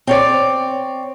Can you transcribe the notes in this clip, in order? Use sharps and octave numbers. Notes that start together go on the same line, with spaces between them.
C4 C#5 D5